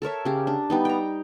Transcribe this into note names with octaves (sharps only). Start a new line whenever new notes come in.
A4 A#4 C#5 E5
C#3 G4
D4
G3 B3 D#4
G5 A#5